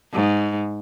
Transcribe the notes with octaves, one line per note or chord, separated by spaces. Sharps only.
G#2